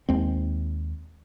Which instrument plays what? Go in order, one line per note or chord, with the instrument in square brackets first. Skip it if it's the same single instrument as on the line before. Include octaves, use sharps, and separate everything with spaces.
[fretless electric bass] D#2 G#3 C4